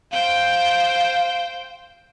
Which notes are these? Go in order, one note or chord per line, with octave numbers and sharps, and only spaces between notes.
C5 F5 G5